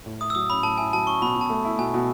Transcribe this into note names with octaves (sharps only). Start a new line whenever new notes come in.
A2
E4 D#6
E6
F#3 D#6
C#4 B5
A2 A5
E4 G#5
F#3 A5
C#4 C#6
B2 B5
B2
A5
A3
E4
B2 G#5
B2